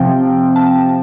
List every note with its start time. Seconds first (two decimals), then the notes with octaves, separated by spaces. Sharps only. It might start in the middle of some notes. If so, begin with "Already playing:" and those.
Already playing: C3 F3 C4 G5
0.56 A5